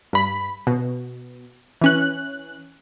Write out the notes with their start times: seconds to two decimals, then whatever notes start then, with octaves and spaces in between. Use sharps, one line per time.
0.13 G2 B5
0.67 B2
1.81 E3 C#4 F#6